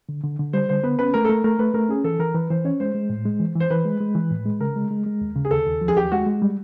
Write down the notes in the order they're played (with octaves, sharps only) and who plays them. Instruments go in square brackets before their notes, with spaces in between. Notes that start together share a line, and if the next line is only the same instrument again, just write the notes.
[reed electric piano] D3
D3
D3
[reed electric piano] G3 [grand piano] C5
[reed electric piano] D3 [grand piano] C5
[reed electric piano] B3 [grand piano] B4
[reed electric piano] C#4 [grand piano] B4
[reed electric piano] A3 [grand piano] A#4
[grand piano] A4
[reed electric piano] A3 [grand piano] A#4
[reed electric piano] A3 [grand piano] A#4
[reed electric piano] A3 [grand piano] B4
[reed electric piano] A3 [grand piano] A#4
[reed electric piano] C#4 [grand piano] G#4
[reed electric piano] E3 [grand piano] A4
[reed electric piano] E3 [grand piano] A#4
[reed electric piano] E3 [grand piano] B4
[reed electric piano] E3 [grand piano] C5
[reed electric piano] C#4 [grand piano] C#5
[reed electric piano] G#3 [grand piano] C5
[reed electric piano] G#3
A2
G#3
E3
[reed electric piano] E3 [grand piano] C5
[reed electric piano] E3 [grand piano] B4
[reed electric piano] G#3
G#3
E3
A2
G#3
[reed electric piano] C#3 [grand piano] A#4
[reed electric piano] G#3
G#3
G#3
D#2
C#3
[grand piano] G#4
[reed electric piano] D#2 [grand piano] A4
[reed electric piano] D#2
F3
[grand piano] G#4
[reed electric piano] D#2 [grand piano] G4
[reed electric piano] G#3 [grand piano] F#4
[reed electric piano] G#3
G3